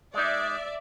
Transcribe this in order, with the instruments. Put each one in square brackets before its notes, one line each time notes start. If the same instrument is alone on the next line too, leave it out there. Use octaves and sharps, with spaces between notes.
[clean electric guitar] G#3 D#4 [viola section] D5 E5